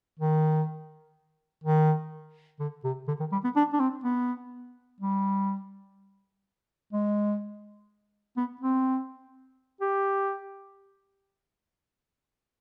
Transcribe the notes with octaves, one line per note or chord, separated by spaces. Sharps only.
D#3
D#3
D3
C3
D3
D#3
G3
B3
D4
D4
C4
B3
G3
G#3
B3
C4
G4